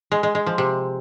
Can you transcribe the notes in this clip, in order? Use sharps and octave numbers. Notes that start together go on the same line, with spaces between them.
G#3
G#3
G#3
F3
C3